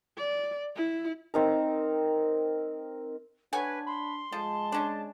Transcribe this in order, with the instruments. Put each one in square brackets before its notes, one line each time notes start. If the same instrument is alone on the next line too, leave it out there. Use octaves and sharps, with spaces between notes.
[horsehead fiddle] D5
E4
[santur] C4 D#4 A#4
[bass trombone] D4 [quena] B4 [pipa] C#5 F#5 G#5
[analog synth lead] B5 [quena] C6
[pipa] F3 [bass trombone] G#3 [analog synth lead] A5
[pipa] C#4 D4